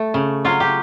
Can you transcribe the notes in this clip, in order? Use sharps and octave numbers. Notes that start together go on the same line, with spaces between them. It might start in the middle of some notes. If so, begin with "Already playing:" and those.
Already playing: A3
C#3
F#3 F4
G4